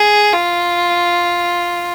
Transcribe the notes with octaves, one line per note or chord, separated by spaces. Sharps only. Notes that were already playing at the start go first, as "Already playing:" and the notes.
Already playing: G#4
F4